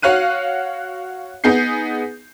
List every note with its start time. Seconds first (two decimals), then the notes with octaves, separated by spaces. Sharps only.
0.02 F#4 C#5 F5 F#6 D#7
1.44 B3 D#4 G#4 G6 C7